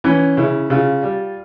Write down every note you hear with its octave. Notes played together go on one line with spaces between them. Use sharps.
E3 C#4
C#3 E4
C#3 F4
G3